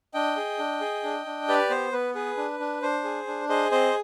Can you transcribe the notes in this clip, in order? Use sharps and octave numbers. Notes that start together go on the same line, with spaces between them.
D4 D#5 G5
G#4
D4
G#4
D4
D4
G4 B4 D5
B3 C5
B3 B4
G#4 B4
D4
D4
D4 C5
G#4
D4
G#4 C5 D#5
C4 C5 D#5